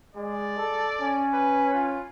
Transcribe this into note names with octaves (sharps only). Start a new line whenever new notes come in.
G#3 D5
A4
C#4
B4
F4